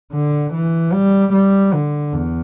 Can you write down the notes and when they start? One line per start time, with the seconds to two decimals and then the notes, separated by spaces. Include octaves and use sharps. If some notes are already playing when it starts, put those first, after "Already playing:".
0.13 D3
0.54 E3
0.93 G3
1.33 G3
1.74 D3
2.13 E2